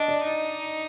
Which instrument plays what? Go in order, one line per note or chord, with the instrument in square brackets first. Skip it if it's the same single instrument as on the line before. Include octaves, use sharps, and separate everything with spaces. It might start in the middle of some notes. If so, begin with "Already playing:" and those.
Already playing: [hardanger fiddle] D4 [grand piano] D#5
[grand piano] D5
[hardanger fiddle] D#4